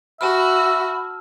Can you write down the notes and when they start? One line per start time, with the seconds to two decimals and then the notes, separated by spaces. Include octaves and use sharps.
0.21 F#4 E5 A5 B5 E6 F6